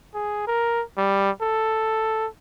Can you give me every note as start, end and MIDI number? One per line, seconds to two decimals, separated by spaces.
0.14 0.44 68
0.47 0.82 70
0.97 1.31 55
1.42 2.27 69